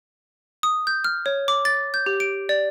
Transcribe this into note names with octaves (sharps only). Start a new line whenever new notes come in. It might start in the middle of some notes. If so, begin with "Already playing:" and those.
D#6
G6
F6
C#5
D6
A6
G6
G4
D7
D5